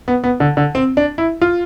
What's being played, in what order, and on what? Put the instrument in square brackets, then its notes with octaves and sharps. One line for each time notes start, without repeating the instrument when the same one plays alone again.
[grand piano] B3
B3
D3
D3
C4
D4
E4
F4